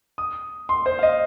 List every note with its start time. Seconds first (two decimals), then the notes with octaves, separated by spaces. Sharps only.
0.18 D#6
0.69 C6
0.86 C5
0.99 F5
1.03 D#5